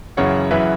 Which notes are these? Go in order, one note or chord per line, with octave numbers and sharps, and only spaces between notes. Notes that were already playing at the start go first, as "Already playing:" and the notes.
F#2 C#3 E3 C#5 F#5
F#2 C#3 E3 B4 E5